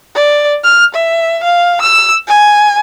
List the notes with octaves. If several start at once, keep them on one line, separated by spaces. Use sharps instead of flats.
D5
F6
E5
F5
E6
G#5